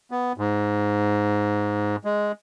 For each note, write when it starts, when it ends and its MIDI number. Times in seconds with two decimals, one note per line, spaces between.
0.11 0.32 59
0.38 1.96 44
2.05 2.32 56